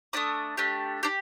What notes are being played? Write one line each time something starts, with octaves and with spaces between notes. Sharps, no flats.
A3 D4 G4 D#6
A3 D4 G4
D4 G4